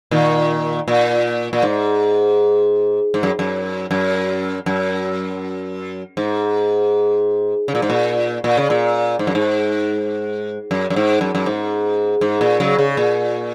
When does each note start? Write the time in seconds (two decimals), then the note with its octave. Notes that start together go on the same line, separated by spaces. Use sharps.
0.11 A#2 D#3
0.88 A#2
1.53 A#2
1.63 G#2
3.14 G#2
3.23 F#2
3.39 F#2
3.91 F#2
4.66 F#2
6.17 G#2
7.68 C#3
7.75 A#2
7.82 G#2
7.90 A#2
8.44 A#2
8.57 C#3
8.70 A#2
9.19 G#2
9.27 F#2
9.35 G#2
10.71 F#2
10.90 F#2
10.96 G#2
11.21 F#2
11.35 F#2
11.46 G#2
12.21 G#2
12.41 A#2
12.60 C#3 F#3
12.78 C#3
12.97 A#2